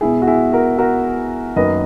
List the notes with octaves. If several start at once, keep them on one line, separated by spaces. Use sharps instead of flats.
B2 G#3 E4 G#4
F#4
E4 G#4
F#4 A#4
F#4 A#4
F#2 D#3 F#3 A#3 B4 D#5